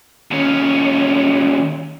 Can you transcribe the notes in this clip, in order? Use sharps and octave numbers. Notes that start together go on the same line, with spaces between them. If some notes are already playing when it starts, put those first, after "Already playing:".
D#2 C#4